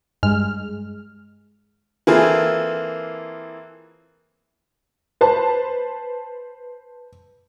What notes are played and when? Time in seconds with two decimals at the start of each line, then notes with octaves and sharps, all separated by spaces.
0.23 G2 G#3 F6
2.07 E3 A#3 C4 F4 G#4 A4
5.21 B4 C5 A5